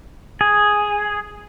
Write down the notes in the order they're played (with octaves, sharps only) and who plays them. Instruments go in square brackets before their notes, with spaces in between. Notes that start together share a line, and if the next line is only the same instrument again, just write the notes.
[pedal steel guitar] G#4